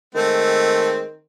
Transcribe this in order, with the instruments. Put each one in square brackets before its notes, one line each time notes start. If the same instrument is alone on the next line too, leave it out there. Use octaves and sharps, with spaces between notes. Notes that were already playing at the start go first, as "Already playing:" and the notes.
[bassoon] D#3 [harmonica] G#3 A3 C4